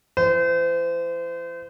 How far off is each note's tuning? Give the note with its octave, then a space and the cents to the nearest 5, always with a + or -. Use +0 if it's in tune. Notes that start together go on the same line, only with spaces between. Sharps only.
E3 +35 C5 -35